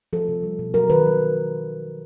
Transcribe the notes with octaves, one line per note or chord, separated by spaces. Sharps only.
F3 A4
C3
G3
B2
F#3 A#4
D#3 B4
F#3